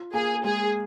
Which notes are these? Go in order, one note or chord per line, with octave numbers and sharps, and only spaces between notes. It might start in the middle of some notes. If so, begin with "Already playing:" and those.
Already playing: F4
A#3 G#4
G#3 G#4